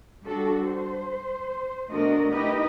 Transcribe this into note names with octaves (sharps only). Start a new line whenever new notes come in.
G3 D4 F#4 A4
C5
B2 A3 D4 F#4 A#4 D#5
D#4 E4 G4 B4 D#5